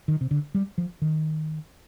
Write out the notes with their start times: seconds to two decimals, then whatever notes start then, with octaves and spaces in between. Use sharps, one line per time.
0.08 D#3
0.21 C3
0.31 D3
0.55 G3
0.78 F3
1.02 D#3